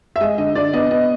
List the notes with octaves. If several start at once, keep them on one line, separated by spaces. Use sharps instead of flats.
E5
G#3 D#5
D3 D#5
D3 D5
B3 D#5
B3 D#5